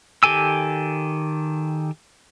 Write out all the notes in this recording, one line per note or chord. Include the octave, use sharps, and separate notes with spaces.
D#3 G4 A4 G#5 E6